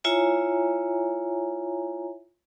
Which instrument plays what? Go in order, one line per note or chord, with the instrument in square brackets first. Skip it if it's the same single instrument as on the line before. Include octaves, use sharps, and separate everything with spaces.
[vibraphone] E4 F4 C#5 E5 G#5 A#5